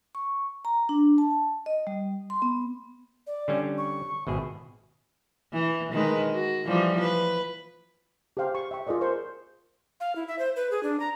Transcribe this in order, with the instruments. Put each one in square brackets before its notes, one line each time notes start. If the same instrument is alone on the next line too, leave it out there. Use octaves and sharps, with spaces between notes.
[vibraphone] C#6
A#5
D4
A5
D#5
G3
C6
B3
[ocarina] D5
[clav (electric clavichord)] D3 G3 C#4
[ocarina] C#6
[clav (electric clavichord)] G#1 B2 G#4 [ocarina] E5
[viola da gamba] E3
D#3 G#3 B4
F#4
E3 F3 G3
B4
[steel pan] G4 G#4 C5 F5 G5
C#6
E5 G5 C#6
F4 G#4 A#4 D5 D#5
A#4 C5 C6 C#6
[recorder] F5
E4
E5
C5
B4
G#4
D4
A#5